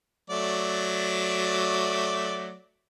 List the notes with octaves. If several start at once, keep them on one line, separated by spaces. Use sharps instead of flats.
F#3 A3 D5